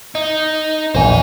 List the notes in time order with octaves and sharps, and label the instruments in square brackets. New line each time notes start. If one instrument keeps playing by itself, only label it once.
[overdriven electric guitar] D#4
[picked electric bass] A#1 E2 A#2 [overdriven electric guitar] C5 G#5